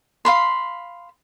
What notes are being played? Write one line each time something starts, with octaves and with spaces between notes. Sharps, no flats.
F5 B5 C6